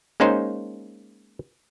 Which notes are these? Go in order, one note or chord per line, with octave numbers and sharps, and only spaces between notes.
G#3 A#3 C#4 D#4 C5